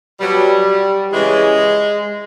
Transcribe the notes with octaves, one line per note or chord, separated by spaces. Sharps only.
B2 F#3 G3
C#3 E3 G#3